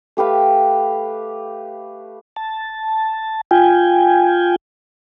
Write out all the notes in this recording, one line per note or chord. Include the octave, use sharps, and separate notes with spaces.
A3 G4 B4 F5
A5
F4 G5 G#5